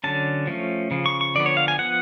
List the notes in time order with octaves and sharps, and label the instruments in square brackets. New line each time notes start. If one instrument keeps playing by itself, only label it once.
[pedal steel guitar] D3 F#3 C#4 A5
F3 A3 C#4
C#3 F3
C#6
C#6
D3 F3 B3 D5
C#5
F5
G#5
F3 B3 F#5